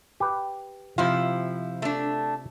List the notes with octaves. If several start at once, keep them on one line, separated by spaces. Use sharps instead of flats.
G4 B4
C3 F3 E4 F4
A3 D4